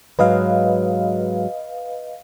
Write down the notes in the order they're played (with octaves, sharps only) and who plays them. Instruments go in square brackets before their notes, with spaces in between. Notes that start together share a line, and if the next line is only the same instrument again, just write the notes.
[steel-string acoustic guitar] G#2 F#3 [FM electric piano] B4 D#5 F5